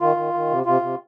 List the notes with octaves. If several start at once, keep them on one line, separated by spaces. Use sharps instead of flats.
D#3 F4
D#3
D#3
C3
C3 F4
C3